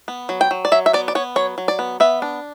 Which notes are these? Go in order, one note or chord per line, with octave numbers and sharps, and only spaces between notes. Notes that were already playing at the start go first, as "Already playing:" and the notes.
B3
F#3
G5
F#3
D5
F#3 E5
E5
B3 D5
D5
B3 C#5
F#3 C#5
F#3
D5
B3
B3 E5
D4